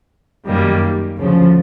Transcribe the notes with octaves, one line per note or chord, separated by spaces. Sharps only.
F#2 D#3 G3 A#3
D2 C#3 F3